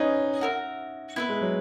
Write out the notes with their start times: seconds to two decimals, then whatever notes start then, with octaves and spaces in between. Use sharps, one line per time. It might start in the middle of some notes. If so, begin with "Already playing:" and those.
Already playing: C#4 D#4 G#4 B4 D#5 G#5
0.41 F#4 A#4 E5
1.16 B3 E4 B4 E5
1.29 G#3
1.41 F#3